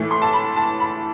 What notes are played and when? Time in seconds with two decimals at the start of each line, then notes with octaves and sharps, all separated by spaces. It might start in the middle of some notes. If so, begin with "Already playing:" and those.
Already playing: A2 E3 A3
0.11 C6
0.22 A5
0.33 B5
0.56 A5
0.80 B5